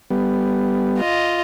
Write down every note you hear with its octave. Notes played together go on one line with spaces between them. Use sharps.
G3 B3
F4 D#5